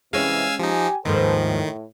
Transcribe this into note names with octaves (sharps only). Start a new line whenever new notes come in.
C3 E3 G#3 C#4 F5 G#5 E6
F3 D#4 G4 G#5
D#2 G#2 D#3 F3 A4 B4 C5
A2